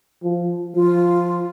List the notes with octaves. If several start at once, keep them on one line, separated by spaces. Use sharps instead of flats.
F3
F3 F4